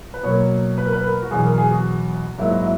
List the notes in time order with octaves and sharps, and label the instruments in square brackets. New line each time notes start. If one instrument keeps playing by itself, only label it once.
[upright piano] B4
B2 F#3 A#3 C#5
B4
A#4
B4
A#4
F#4
E2 B2 F#3 G#4
A#4
G#4
F#4
G#2 F#3 A#3 E4
F#4
E4